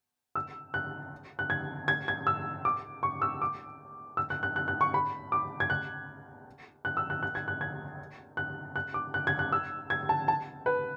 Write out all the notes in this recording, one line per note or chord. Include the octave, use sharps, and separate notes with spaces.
E6
F#6
F#6
G#6
G#6
G#6
E6
D6
C#6
E6
D6
E6
F#6
F#6
F#6
F#6
C#6
B5
D6
G#6
F#6
F#6
E6
F#6
F#6
G#6
F#6
G#6
F#6
F#6
D6
F#6
G#6
F#6
E6
G#6
A5
A5
B4